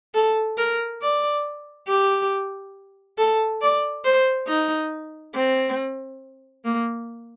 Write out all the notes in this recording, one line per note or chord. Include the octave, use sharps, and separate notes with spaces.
A4
A#4
D5
G4
A4
D5
C5
D#4
C4
A#3